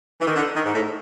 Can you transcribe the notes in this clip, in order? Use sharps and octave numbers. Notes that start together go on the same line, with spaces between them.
E3
D#3
D3
D#3
G#2
A2